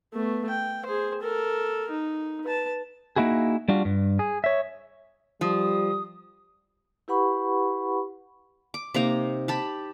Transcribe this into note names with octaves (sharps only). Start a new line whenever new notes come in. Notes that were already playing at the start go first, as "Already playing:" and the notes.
A3 B3
G5
G#4 C5
A4 A#4
D#4
B4 A5
A#3 D#4 E4 F#4 G#4
G3 D4 F4 F#4
G2
G#4
C#5 E5
F3 G3 D#6
E4 G4 B4 F#5 B5 C#6
D6
C3 A#3 D#4 A#5
G4 A5 B5